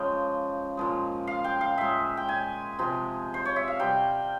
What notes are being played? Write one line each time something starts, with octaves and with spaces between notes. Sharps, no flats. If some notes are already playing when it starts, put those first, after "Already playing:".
Already playing: C#3 F3 G#3 G5
A#2 F3 G#3
F5
G5
F5
A#2 G#3 E5
G5
G#5
C3 F3 G#3
C5
C#5
E5
F5
C3 G3 G5